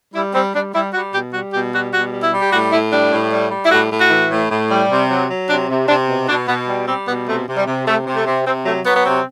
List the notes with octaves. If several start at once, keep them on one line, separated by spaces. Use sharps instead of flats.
G3 E4
G3 C4
G3 D4
G3 E4
G3 F#4
B2 G4
G3 F#4
B2 G4
G3 F#4
B2 F#4
G3
E4
G3
G4
A2 F#4
A2 E4
G3 D4
A2
G3
G3
E4
A2 F#4
A2
F#4
E3
A2
A2
G3
C3
F#3
F#3
C3 D4
C3
C3 D4
B2
B2 D4
B2 B3
G3
G3 C4
B2 B3
C3 A3
C3
G3
C3
C3 A3
C3
A3
C3
C3 C4
F#3 A3
F#3 B3
B3
C3 C4